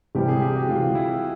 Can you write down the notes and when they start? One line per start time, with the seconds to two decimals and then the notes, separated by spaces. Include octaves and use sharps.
0.15 C2 C3 E3 G3 G4
0.28 G#4
0.42 G4
0.56 F#4
0.68 C2 C3 E3 G3 F4
0.82 F4
0.95 E4
1.10 F#4